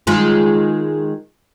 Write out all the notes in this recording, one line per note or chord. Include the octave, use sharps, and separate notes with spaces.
D#3 G#3 F4